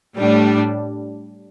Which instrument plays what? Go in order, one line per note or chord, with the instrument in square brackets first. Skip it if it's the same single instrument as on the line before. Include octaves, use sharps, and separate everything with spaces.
[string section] A2 G3 D4